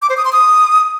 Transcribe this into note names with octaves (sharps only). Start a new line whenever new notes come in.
D6
C5
D#6
C6
D#6